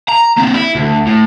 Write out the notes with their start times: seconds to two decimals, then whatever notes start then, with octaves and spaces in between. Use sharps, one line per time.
0.08 A#5
0.37 A#3 C4
0.54 E4
0.75 D2
1.07 A2